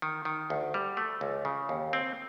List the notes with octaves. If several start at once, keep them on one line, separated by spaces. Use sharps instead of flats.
D#3
D#3
D2
G3
A3
C#2
C#3
D#2
C4